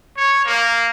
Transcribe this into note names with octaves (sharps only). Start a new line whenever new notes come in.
C#5
A#3